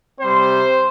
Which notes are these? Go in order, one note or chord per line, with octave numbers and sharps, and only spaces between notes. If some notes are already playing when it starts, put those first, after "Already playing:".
C3 G3 C4 C5